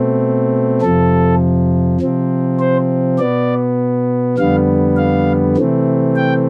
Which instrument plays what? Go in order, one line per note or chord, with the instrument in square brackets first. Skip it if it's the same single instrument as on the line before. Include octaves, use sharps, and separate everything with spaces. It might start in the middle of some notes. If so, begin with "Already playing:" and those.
Already playing: [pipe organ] B2 A3 C4
F2 C3 F3 A4
C3 F3 C4
C5
B2 B3 D5
F2 D3 G3 B3 F5
F5
C3 E3 A3 C4
G5